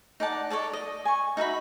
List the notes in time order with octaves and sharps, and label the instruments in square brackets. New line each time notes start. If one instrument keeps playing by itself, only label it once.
[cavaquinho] D#4 D5 F#5 A5
A4 C#5 D5 A5
D#5
G#5 C#6
D#4 F#4 E5 B5